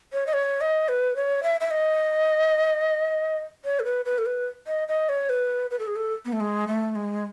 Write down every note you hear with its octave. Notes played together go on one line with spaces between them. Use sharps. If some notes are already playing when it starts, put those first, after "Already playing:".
C#5
D#5
C#5
D#5
B4
C#5
E5
E5
D#5
C#5
A4
B4
B4
A4
B4
D#5
D#5
C#5
B4
B4
A4
G#4
A4
B3
A3
G#3
A3
G#3